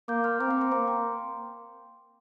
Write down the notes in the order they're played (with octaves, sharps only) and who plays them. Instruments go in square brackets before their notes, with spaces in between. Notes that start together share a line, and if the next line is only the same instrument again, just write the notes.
[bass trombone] A#3 [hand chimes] D6 G6
[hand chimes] C6 F6
[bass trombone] C4 [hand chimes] A#5 D6
[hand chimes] G5 C6
A#5 D6
[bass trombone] A#3 [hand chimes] A#5 D6
[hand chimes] G5 C6